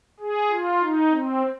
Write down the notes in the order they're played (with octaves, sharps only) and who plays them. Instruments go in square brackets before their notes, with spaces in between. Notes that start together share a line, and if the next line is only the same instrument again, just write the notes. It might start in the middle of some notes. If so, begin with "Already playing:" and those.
[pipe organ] G#4
F4
D#4
C4